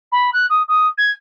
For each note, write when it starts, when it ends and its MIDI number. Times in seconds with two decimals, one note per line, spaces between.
0.11 0.30 83
0.33 0.46 90
0.49 0.62 87
0.68 0.87 87
0.97 1.10 92